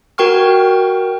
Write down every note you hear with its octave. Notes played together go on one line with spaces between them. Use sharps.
F#4 A#4 G5 C#6 F6